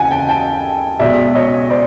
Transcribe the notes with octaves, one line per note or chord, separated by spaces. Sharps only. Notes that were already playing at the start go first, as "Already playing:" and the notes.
Already playing: D#2 C#3 E3 F#5 G#5 A5
G5 A5
G5 A5
B1 B2 G#3 D5 E5
C#5 D#5
C5 D5